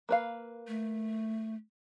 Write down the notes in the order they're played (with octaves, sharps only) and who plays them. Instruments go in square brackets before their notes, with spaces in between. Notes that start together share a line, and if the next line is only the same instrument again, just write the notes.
[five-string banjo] A#3 B4 F5
[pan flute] A3